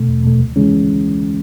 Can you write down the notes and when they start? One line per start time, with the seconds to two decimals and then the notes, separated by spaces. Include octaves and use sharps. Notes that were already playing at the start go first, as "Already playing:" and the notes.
Already playing: B2 A3
0.08 E2
0.24 B2 A3
0.40 D2
0.56 C#3 E3 G#3 C#4